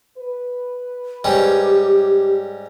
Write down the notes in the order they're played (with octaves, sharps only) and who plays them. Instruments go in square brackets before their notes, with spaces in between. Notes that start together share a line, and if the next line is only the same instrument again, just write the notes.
[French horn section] B4
[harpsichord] G#2 G3 C#4 [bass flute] G4